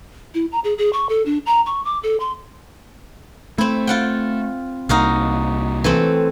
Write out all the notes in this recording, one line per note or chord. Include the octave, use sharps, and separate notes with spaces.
E4
A#5
G#4
G#4
C#6
A4
D4
A#5
C#6
D6
A4
C6
A3 C4 E4
F4 F#5 G5
C2 A#3 D#4 F#4 F5
E3 A3 C4